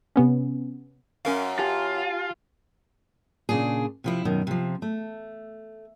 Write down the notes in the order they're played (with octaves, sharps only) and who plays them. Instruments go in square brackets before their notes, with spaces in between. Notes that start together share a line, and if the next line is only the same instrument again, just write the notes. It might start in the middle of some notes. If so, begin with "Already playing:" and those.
[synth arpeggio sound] C3 B3 C#4
[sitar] F#2 [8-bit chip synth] C#4 A#4 F5
[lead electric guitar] F4 [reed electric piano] G4 G#5 A5
[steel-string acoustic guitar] A#2 C#3 D4 G#4
C3 F3 E4
F#2 B2 D#3
C3 F3
A3